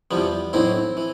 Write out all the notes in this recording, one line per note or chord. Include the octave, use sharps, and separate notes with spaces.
E2 C3 F3 G3 B3
B1 A2 E3 C4 E4
E3